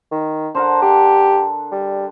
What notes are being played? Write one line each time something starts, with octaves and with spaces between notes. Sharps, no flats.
D#3
D3 A#4 C5 F#5
G4 A5 C6
G3